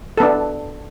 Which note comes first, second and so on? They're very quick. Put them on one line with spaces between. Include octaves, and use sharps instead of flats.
A4 B3 D4